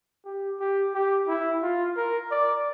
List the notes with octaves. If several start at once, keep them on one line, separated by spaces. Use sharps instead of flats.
G4
G4
G4
E4
F4
A#4
D5